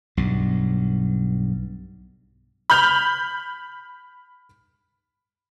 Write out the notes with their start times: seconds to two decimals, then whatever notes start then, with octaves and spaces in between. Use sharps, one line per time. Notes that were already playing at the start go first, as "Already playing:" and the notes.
0.17 B1 G2
2.70 B5 F6 G6 F7